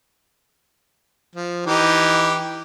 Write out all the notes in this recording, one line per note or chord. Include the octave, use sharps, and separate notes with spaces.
F3
E3 D#4 G4